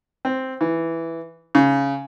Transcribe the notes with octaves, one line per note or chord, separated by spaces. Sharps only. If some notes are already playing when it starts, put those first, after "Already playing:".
C4
E3
C#3